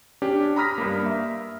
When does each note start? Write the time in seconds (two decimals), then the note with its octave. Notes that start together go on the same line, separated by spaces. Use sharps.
0.22 C#4 D4 G4
0.56 A#5 B5 D#6 F6 A#6 B6
0.78 G2 A#3
1.06 E5